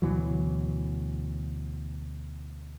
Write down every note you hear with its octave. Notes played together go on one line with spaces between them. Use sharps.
D2 B2 E3 F#3